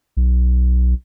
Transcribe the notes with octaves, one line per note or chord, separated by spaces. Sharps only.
B1